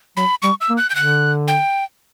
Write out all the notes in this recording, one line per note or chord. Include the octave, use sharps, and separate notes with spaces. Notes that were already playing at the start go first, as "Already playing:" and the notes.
F#3 B5
G3 C#6
E6
A#3
F#6
G6
D3 F#6
G5